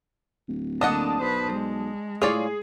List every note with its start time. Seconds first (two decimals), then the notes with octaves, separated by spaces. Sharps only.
0.48 D1
0.81 D3 A#3 D4 D#5 F#5 A5 D#6
1.21 B1 B4 C5
1.53 G#3
2.22 A2 F4 G#4 C#5 D5